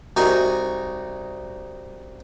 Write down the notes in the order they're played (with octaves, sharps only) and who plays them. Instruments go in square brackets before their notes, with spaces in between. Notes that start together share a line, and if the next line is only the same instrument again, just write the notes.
[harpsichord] C2 D#4 F#4 G#5